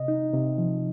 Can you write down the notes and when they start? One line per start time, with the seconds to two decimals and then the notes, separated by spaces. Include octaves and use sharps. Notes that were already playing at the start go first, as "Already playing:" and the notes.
Already playing: C3 D#5
0.08 D#4
0.33 C3
0.58 F3